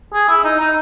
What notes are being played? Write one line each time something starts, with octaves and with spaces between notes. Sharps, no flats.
G#4
E4
D#4
D#4